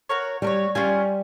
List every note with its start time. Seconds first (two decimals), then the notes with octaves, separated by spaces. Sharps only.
0.09 F#4 A#4 C#5
0.42 G3 F#4 A#4 C#5
0.75 G3 C#4 F4 G#4